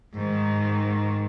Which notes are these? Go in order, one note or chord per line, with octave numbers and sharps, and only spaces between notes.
G#2 D#3